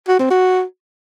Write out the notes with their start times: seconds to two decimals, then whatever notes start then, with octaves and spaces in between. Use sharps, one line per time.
0.08 F#4
0.19 C4
0.30 F#4